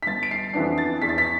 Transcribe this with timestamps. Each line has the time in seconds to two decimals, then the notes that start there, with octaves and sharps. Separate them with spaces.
0.03 B6
0.07 G1 A6
0.23 D7
0.31 C7
0.54 F2 E3 B3 D4 C7
0.78 A6
1.02 E2 B6
1.09 A6
1.18 B6